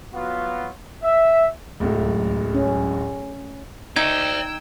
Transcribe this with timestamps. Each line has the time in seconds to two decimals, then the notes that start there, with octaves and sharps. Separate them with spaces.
0.14 F#3 B3 F4 F#4
1.03 E5
1.80 D1 C#2 F#2 A3
2.54 C#4
3.96 D#4 D5 E5 G5 E6 G#6